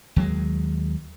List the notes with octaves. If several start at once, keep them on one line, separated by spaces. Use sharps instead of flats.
D#2 F#3 G#3